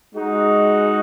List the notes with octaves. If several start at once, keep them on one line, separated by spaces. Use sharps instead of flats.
G#3 D#4 F#4